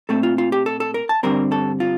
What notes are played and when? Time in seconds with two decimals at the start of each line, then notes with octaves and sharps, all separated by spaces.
0.09 A#2 A3 C4 A4
0.23 F4
0.38 F4
0.52 G4
0.66 A4
0.80 A4
0.94 A#4
1.09 A5
1.23 G2 D3 G3 C4 A#4
1.52 A4
1.80 F4